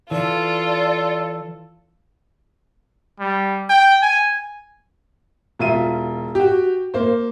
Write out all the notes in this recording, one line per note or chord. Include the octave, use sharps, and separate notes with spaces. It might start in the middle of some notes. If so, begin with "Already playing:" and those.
E3 F4 A4 D5
G3
G5
G#5
E1 F4 E5 D#7
F#4 G4
A#3 C5